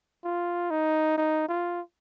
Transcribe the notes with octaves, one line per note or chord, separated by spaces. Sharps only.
F4
D#4
D#4
F4